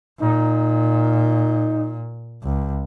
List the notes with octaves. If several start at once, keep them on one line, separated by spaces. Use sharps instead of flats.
A#2 D#4
C#2